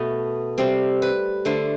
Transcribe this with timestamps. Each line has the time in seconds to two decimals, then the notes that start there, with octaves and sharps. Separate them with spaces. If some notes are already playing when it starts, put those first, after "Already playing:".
Already playing: B2 A3 B3
0.58 C3 G3 C4
1.02 B4
1.45 D3 A3 C5